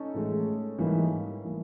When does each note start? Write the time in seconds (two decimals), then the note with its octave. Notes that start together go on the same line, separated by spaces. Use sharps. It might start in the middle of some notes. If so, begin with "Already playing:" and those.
Already playing: C#4 D#4 A4
0.14 A2 E3 G#3
0.78 G#2 E3 G3 A#3
1.44 E3 G3 A#3